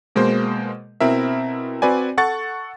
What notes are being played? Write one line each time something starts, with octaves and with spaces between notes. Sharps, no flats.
B2 G#3 A#3 C5
B2 C4 E4 A#4 E5
C4 F#4 B4 D5 G#5
A4 F#5 C#6 A6